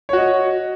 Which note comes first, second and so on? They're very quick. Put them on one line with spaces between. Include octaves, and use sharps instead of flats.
C#5 F#4 D#5